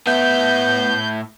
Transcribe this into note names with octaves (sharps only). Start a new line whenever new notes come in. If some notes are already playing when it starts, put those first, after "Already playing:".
A2 B3 E5 G6